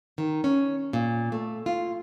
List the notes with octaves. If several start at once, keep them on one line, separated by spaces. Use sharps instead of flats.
D#3
C#4
A#2
A3
F4